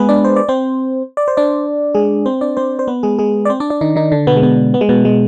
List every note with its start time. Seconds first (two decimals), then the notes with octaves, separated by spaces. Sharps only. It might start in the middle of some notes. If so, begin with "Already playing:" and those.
Already playing: G#3 B3 G#4 B4
0.09 D4 D5
0.24 C5
0.36 D5
0.49 C4 C5
1.17 D5
1.28 C5
1.37 D4 D5
1.94 G#3 G#4
2.26 C4 C5
2.41 D4 D5
2.57 C4 C5
2.79 C5
2.88 B3 B4
3.03 G#3 G#4
3.19 G#3 G#4
3.45 D5
3.50 C4 C5
3.60 D4 D5
3.70 D4 D5
3.81 D#3 D#4
3.96 D#3 D#4
4.12 D3 D4
4.27 B2 B3
4.36 G#3
4.42 B2 B3
4.74 B3
4.81 G#3
4.89 B2 B3
5.05 G#3